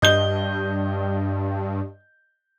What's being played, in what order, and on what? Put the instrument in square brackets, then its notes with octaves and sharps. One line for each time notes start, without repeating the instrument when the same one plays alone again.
[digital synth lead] G2 [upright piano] D#5 G6 G7